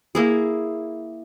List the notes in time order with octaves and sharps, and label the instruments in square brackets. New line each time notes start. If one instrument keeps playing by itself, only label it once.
[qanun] A#3 E4 G#4